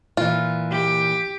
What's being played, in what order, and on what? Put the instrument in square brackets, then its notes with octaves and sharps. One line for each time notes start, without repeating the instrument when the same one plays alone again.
[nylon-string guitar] A#2 E3 [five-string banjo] F4
[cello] G4